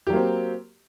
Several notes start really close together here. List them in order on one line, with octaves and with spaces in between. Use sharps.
G4 F#3 A#3 C4